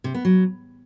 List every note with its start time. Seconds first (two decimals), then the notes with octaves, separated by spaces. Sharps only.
0.04 C3
0.14 B3
0.25 F#3